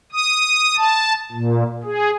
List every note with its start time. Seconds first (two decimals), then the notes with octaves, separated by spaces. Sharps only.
0.12 D#6
0.77 A5
1.32 A#2
1.84 G#4